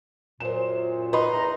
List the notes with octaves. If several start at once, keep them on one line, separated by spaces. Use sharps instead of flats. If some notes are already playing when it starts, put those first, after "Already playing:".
F#2 A#2 C5 E7
D#4 B4 B5 C6
E2 A#5